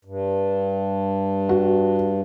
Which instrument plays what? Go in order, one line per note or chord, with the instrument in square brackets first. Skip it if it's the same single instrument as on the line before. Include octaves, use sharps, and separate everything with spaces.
[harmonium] G2
[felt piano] F#4